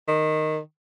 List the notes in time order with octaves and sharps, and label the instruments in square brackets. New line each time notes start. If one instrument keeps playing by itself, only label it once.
[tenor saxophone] D#3